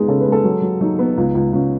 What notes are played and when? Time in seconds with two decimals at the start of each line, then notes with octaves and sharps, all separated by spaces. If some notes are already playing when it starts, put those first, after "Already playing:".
Already playing: G#3 B3 D#4 G#4
0.08 C#3 A4
0.21 B4
0.26 G#3
0.32 A4
0.44 F#3
0.62 F#3
0.81 F#3 D#4
0.99 B3
1.17 C#2
1.35 C#2
1.53 C#2 C#4